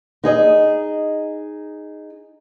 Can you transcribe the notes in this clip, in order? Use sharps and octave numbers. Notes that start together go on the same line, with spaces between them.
D#4 G#4 D#5